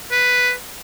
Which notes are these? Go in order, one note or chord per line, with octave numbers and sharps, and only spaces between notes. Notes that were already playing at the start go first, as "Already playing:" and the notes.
B4